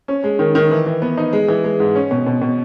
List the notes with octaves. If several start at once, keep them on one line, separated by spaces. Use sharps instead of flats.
C#4
G#3
D#3
D#3
E3
E3
B3
D#4
G#3
E3
G#3
G#2
C#4
B2
B2
B2